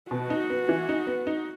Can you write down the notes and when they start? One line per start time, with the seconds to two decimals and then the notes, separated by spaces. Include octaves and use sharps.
0.11 B2 F#4
0.30 D#4
0.50 B3
0.69 E3
0.89 D#4
1.07 B3
1.27 D#4